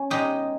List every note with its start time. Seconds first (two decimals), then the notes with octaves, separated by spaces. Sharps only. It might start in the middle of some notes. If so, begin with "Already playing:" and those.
Already playing: C#4
0.10 B2 G#3 D#4 G4